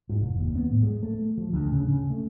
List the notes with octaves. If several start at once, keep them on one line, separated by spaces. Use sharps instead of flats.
G#2
F1
D#2
B3
A2
G#3
A3
F3
D2
C#3
C#3
A3